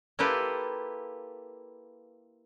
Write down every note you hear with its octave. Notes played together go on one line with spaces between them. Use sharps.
A#3 E4 F4 G4 A4 B4